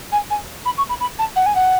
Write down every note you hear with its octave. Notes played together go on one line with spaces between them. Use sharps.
G#5
G#5
B5
C#6
B5
B5
A5
F#5
G#5
F#5